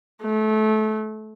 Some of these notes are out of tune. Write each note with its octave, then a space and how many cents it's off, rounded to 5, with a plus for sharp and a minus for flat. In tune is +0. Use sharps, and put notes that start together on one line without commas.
A3 -25